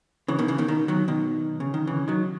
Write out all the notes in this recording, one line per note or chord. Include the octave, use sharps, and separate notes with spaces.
C#3 E3
B2 D#3
C#3 E3
B2 D#3
B2 D#3
D#3 F#3
B2 D#3
C#3
D#3
C#3 E3
D#3 F#3